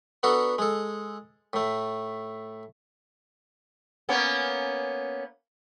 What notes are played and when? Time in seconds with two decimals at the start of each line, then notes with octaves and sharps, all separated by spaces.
0.23 B3 D4 F#4 A4 A#5
0.58 G#3 A4
1.53 A2 A3
4.09 A#3 B3 C#4